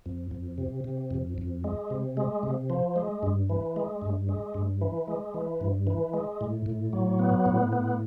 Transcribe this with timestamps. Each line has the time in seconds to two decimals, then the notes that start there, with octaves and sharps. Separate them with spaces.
0.06 F2
0.31 F2
0.58 C3
0.84 C3
1.11 F2
1.38 F2
1.64 G#3
1.90 C3
2.17 G#3
2.43 C3
2.70 F3
2.96 G#3
3.23 G2
3.50 E3
3.76 G#3
4.02 G2
4.29 G#3
4.54 G2
4.81 E3
5.08 G#3
5.34 E3
5.61 G2
5.87 E3
6.14 G#3
6.41 A2
6.66 A2
6.93 F#3
7.19 B3
7.46 A2
7.73 B3